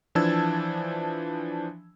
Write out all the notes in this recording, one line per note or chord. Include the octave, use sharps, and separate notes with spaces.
E3 F3 D4 A5 E6 G#6